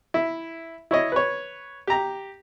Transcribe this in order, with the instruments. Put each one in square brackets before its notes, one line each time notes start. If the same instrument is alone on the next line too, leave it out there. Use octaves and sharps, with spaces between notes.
[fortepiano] E4
E4 C#5 D#5
B4 C#5
G4 A#5